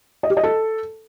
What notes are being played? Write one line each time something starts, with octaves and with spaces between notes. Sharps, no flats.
D#5
G4
D#5
A4